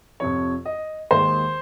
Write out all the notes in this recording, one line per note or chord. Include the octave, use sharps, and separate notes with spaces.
F2 C3 F3 C#5
D#5
D#2 D#3 G#3 C5